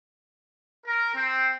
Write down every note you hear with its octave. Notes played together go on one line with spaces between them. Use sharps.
A#4
C4